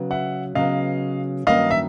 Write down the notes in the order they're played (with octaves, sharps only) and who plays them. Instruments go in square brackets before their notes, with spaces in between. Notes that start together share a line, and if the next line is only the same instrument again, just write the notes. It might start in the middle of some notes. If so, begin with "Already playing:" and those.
Already playing: [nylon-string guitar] C#3 F#3 B3
[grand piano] E5 F#5
[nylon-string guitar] C#3 F#3 B3 [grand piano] D#5 F5
[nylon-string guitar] G2 D#3 F#3 A#3 C#4 [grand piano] D#5 F5
[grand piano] E5